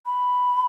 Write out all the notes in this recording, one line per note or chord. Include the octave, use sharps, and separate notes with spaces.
B5